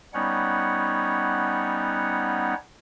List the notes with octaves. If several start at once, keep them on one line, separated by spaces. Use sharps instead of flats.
G3 B3 C#4 D#4 C#5 F#5